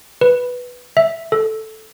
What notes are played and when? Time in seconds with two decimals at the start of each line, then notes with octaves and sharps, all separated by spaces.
0.21 B4
0.97 E5
1.32 A4